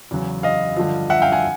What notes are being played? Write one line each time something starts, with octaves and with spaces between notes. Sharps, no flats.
E2 C#3 F#3
D#5 F5
G2 D3 F3
E5 F#5
F5 G5
F#5 G#5